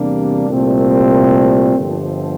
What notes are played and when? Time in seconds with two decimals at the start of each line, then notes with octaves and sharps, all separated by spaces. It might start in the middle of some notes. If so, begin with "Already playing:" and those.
Already playing: E2 C3 G3 A#3 D4
0.48 C2 A#2 A3 C4
1.77 G1 G2 F3